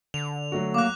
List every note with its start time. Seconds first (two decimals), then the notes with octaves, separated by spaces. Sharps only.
0.14 D3 F7
0.52 F#3 A3 F#4
0.74 A#3 D6 F#6